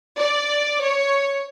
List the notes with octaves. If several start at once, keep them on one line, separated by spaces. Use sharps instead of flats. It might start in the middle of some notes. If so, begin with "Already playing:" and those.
D5
C#5